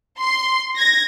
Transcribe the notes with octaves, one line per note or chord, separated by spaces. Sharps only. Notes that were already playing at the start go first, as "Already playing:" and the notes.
C6
G#6 A#6